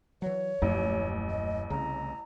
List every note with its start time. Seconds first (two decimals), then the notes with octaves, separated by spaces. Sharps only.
0.22 E3 F#3 C#5
0.62 D#1 A1 F#2 F3
1.29 D#5
1.70 C2 C#3 A#5